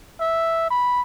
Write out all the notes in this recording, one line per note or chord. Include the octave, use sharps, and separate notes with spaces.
E5
B5